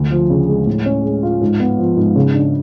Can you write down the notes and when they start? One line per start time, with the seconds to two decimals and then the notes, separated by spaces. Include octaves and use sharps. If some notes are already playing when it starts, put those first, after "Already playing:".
Already playing: D2
0.11 F3
0.30 C#3
0.48 G#3
0.67 A2
0.86 C#4
1.04 G#3
1.23 F4
1.42 G#2
1.60 B3
1.78 F3
1.97 G#2
2.16 C#3
2.34 D4